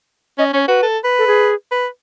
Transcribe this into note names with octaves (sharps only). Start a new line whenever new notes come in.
C#4 D#5
C#4 C#5
F#4 B4
A4
B4
A4
G#4
B4